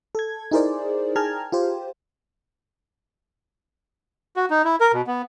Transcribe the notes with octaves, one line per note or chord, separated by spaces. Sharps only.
A4 G#6
D#4 E4 G#4 A#4 C5 D5
G#4 G5 A5 A#5 F6 G#6
F4 G4 C5
F#4
D#4
E4
A#4
B2
B3